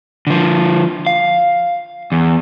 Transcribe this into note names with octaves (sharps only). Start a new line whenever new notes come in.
D3 F3
F5
E2